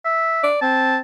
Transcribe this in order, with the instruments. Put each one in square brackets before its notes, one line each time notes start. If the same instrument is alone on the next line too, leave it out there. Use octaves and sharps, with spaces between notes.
[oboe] E5
[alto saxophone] D5
[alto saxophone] C4 [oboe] A5